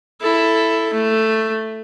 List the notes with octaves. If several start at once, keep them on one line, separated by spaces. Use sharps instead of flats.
E4 A4
A3